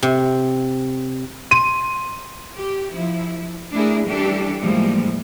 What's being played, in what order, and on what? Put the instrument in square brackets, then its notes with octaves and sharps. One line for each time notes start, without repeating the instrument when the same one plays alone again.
[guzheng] C3
[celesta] C6 [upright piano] D#7
[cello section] G4
F3 E4
A3 D4 E4 G#4 A#4
E3 G3 D4 G4 A4
A2 E3 F3 G3 G#3 A#3